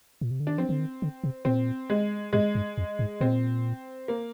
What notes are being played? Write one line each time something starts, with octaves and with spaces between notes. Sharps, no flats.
A#2
C3
D3
D#3 D4
F3 C4
D3
D#3
D3
C3
A#2 C4
G#3
G#2 G#3
G2
F2
G#2
A#2 C4
A#3